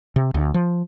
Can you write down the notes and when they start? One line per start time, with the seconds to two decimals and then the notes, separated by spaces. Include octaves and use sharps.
0.16 C3
0.34 D2
0.54 F3